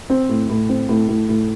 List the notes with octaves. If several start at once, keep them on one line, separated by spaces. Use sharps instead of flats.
C4
A2
A2
C4
A2
A2
A2